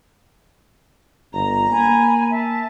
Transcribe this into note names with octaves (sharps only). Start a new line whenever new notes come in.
G1 A#5
A#3 G#5 B5
E5 A5